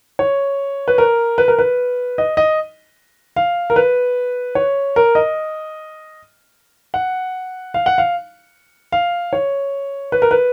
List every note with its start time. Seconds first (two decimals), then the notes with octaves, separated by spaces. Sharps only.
0.19 C#5
0.88 B4
0.98 A#4
1.38 B4
1.48 A#4
1.59 B4
2.18 D#5
2.37 D#5
3.36 F5
3.70 A#4
3.76 B4
4.55 C#5
4.96 A#4
5.15 D#5
6.94 F#5
7.74 F5
7.86 F#5
7.98 F5
8.92 F5
9.33 C#5
10.12 B4
10.22 A#4
10.31 B4